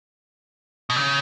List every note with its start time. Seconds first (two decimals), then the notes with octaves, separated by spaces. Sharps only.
0.90 B2
0.96 C#3